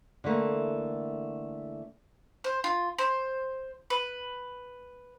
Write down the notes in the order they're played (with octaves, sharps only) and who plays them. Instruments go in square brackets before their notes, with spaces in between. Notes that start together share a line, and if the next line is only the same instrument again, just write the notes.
[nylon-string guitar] D3 E3 A3 A#3
[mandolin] C5
F4
C5
B4